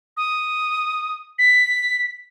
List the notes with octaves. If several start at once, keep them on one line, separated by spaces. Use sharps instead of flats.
D#6
B6